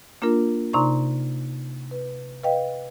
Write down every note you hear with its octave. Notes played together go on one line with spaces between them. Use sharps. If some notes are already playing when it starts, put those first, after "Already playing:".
A#3 D4 F4 A#4
C3 D#4 D5 A#5 C6 C#6
B4
B4 D#5 F5 G5